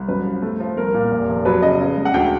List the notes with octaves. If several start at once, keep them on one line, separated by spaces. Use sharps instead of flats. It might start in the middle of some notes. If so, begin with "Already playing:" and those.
Already playing: C2
F#2 B4
F3
A3
F3
C2 A#4
A#2
F1
F1
F#3 B4
C#3 D#5
C#3
G#3
F#5
D2 G5